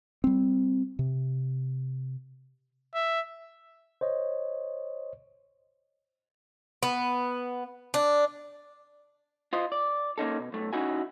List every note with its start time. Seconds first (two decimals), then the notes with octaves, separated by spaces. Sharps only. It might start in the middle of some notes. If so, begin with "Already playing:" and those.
0.24 G3 C4
0.99 C3
2.95 E5
4.01 C5 C#5 D#5
6.83 B3
7.94 D4
9.53 F4 C5 D#5
9.72 D5
10.18 A#3 C#4 D#4 A4
10.40 B2
10.53 B1 A3
10.73 C#4 D#4 E4 F#4 G#5